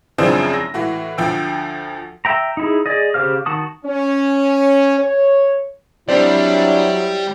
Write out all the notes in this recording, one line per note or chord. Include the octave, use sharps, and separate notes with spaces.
F#2 C#3 F3 C4 D4 E4
A#6
A2 E3 F#4
D2 F3 G5 E6
E5 G5 A#5
D#4 E4 G#4
G#4 D5 D#5
C#3 G4 C5 F5 F6
D#3 F#4 A5 D#6
C#4
C#5
F#3 G3 C4 D4 E4 C5 D5